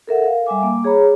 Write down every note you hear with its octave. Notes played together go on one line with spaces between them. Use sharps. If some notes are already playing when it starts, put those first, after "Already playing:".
A4 A#4 E5 F#5
F5
G3 E5 G#5 D6
A#3 D6
G#4 C#5 A#5 B5